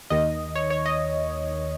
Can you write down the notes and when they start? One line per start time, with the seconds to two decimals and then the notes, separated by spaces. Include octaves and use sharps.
0.10 D#2 D#3 D#5
0.55 C#5
0.70 C#5
0.86 D#5